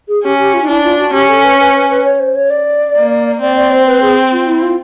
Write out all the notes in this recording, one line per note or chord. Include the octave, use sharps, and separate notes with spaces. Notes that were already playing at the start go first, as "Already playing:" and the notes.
G#4
C#4 G4
G4
F4
D#4
D4 E4
F4
F#4
C#4 G4
A4
B4
B4
B4
B4
C#5
C5
C#5
D5
A#3
C4 D5
D5
C5
B4
G#4
F4
E4
F4